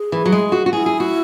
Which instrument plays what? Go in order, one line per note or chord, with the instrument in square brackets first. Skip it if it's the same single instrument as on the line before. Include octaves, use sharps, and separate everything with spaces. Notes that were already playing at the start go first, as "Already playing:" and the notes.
Already playing: [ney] G#4
[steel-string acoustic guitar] E3
F#3
G#3
F#4
F#4
[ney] E4 [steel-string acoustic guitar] G#4
[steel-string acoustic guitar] G#4
F#4